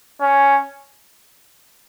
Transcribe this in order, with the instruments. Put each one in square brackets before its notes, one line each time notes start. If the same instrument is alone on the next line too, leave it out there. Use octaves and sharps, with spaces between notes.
[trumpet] C#4